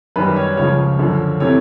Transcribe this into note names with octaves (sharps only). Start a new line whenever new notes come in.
F#2 D#3 G3 B4
C#5
C#2 C#3 F3 C#5
F#2 D3 F3
C3 E3 A3 C4 C#5